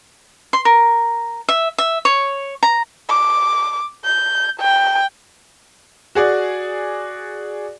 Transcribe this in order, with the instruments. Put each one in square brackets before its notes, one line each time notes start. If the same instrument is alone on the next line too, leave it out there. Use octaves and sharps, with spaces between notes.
[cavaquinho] C6
A#4
E5
E5
C#5
A#5
[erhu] D6
G6
G5
[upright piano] F#4 G#4 D5